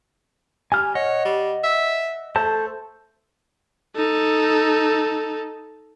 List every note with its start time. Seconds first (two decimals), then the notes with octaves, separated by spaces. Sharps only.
0.72 G3 G#5 F6
0.95 C#5 D#5 F#5
1.25 G3
1.64 E5
2.36 A3 A4 C5 A5
3.96 D#4 A4